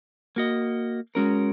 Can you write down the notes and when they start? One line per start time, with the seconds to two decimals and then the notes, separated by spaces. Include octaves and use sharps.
0.36 A#3 F#4 D#5
1.15 G#3 C#4 F#4 A#4